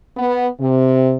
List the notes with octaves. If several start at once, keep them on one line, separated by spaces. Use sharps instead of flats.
B3
C3